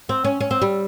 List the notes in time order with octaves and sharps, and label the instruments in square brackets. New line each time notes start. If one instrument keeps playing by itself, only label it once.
[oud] C4
C#4
C#4
C4
G3